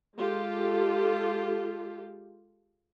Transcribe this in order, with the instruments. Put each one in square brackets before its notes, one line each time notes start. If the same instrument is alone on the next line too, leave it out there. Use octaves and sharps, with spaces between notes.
[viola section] G#3 F4 G4 A4